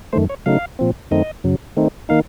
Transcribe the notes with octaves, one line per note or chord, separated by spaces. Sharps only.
F#2 D#3 A3 C5
C#5
C#3 F#3 A3 D#4 F5
A#2 F3 C4
F#2 D#3 A3 C4 D#4 D#5
F#2 C#3 F#3
D#3 A3 C4 D#4
D#3 A#3 D#4 F5